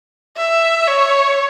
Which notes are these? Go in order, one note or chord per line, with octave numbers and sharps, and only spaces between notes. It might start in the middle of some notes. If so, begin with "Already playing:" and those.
E5
C#5